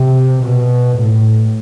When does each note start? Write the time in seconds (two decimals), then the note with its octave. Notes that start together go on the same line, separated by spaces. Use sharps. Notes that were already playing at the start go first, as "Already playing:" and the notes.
Already playing: C3
0.43 B2
0.98 A2